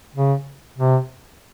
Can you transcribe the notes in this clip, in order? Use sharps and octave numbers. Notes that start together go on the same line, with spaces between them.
C#3
C3